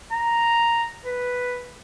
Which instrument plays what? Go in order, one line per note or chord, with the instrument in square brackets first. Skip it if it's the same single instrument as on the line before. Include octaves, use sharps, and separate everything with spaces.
[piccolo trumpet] A#5
B4